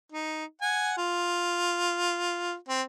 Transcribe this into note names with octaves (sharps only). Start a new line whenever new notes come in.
D#4
F#5 G#5
F4
C4